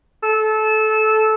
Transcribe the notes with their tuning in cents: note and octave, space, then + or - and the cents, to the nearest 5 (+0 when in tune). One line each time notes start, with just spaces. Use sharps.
A4 -20